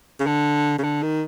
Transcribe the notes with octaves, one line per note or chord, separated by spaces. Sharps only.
C#3
D3
C#3
D3
D#3